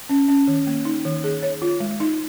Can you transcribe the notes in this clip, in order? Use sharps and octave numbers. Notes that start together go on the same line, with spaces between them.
C#4
C#4
D#3
A#3
D#4
D#3
G#4
C#5
F4
G#3
D#4